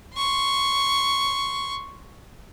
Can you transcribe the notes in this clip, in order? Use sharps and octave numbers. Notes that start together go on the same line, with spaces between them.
C6 C#6